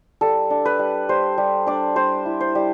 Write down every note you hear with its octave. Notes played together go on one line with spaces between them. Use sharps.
G3 A4
D4
B4
G3
G3 C5
G3
D4 D5
G3 C5
E4
C5
G3